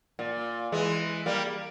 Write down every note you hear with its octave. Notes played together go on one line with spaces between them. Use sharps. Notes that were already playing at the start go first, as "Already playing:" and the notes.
A#2
E3 G#3
G3 A#3